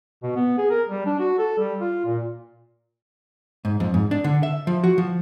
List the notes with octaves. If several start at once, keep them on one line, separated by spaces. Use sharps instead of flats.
B2
B3
G#4
A#4
G3
D4
F#4
A4
G3
F4
A#2
G#2
F2
G#2
D4
D3
E5
F3
F#4
F3